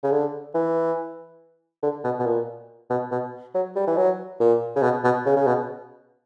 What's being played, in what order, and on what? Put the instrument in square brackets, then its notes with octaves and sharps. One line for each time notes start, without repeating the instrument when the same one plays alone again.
[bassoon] C#3
D3
E3
D3
B2
B2
A#2
B2
B2
F#3
G3
E3
F#3
A#2
C#3
B2
B2
C#3
C#3
B2